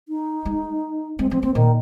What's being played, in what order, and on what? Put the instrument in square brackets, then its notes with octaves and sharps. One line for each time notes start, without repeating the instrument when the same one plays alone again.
[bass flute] D#4
[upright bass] G#3
[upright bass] G#3 [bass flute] C4
[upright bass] F3 [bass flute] C4
[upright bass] A#3 [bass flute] C4
[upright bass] A#2 [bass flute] D#3